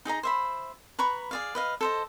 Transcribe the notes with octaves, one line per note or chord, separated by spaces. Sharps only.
D#4 G#4 D#5 A#5
C5 E5 B5
B4 A#5 B5 C#6
G#4 D5 F5
B4 D#5 F5
A4 C5 D#5